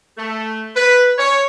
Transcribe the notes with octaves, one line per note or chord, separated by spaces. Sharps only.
A3
B4
C#5